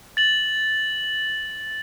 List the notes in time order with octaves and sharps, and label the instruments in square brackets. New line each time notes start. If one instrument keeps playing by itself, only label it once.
[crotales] A6 F#7